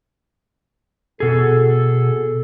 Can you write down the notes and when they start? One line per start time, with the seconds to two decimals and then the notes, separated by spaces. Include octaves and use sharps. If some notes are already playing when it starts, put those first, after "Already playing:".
1.20 B2 G#4 A4